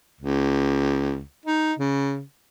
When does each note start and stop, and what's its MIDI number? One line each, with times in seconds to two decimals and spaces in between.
0.21 1.21 37
1.45 1.73 63
1.79 2.22 49